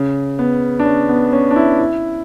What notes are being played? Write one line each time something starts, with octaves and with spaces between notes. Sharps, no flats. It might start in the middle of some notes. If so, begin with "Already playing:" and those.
Already playing: C#3
B3
D4
C#4
B3
C#4
D4
E4
E4